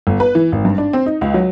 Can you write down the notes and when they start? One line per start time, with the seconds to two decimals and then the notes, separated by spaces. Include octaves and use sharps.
0.07 G1
0.20 B4
0.35 E3
0.52 G#1
0.65 G2
0.78 D4
0.93 C4
1.06 D#4
1.21 C#2
1.34 F#3